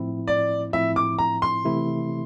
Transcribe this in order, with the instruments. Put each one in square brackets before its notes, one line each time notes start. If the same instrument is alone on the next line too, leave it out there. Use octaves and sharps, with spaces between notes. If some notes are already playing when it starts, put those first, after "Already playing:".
Already playing: [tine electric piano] A2 F3 C4 E4
[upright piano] D5
[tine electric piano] A2 F3 C4 E4 [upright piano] E5
[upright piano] D6
A#5
C6
[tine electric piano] C3 E3 A3 E4